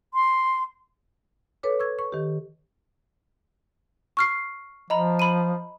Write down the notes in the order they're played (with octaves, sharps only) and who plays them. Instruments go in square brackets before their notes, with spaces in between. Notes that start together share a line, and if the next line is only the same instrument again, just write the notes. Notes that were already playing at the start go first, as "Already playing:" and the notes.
[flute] C6
[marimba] A4 B4 C#5 D6
C#6 E6 G#6
C#6
D#3 G4
[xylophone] C#6 F6 C7
[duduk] F3 [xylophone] D#5 A#5 B5
[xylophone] B5 D#7